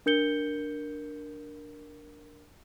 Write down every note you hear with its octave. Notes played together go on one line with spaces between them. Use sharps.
D4 A#4 G6 C#7 G7